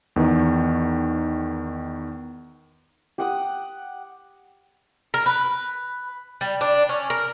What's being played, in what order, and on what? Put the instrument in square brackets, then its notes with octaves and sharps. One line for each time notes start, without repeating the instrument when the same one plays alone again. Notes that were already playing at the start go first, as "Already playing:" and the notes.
[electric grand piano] E2 D#3 B3
[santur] G4 F#5 D#6
[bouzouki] A#4
B4
G3
D4
C#4
A#4